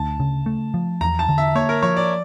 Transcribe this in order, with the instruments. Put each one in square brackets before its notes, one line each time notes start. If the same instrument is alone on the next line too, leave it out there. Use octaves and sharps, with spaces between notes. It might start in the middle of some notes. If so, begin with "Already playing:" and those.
Already playing: [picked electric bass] D2 [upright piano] A5
[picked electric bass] C#3
A3
F3
[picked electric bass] E2 [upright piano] A#5
[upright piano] A5
[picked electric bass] D3
[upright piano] E5
[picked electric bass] A#3 [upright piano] C#5
[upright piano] A#4
[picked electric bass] F3 [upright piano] C#5
[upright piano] D5